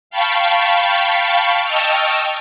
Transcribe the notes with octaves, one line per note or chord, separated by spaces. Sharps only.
F5 G5 A5 B5 C#6
D#5 G5 A5 C#6 E6 F6